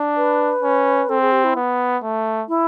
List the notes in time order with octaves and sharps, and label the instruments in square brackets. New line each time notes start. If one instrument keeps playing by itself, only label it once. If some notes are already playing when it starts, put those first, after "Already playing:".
Already playing: [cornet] D4
[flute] B4
[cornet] C#4
[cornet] C4 [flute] A4
[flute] G#4
G4
E4
[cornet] B3
A3
[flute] E4